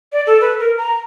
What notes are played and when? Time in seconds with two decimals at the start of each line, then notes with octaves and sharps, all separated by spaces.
0.13 D5
0.27 A4
0.41 B4
0.59 A#4
0.78 A#5